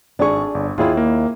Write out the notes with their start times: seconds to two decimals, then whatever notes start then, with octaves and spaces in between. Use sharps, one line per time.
0.19 G#1 D4 G#4 C#6
0.55 G1
0.78 D#2 E4 F4 G#4
0.97 A#3